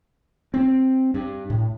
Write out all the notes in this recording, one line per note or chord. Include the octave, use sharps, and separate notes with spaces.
C4
G2
A2